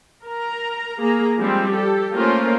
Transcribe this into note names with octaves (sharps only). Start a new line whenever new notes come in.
A#4 A#5
A#3 G#4 A#5
F3 G3 G#3 C4
G4 A4
A3 A#3 C#4 F4 A#4 C5